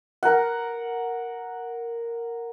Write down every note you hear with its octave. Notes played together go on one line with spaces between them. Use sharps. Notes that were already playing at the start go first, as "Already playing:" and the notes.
A#4 F#5